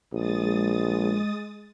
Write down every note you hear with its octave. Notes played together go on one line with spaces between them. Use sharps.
A#1 G#3 D#6 A6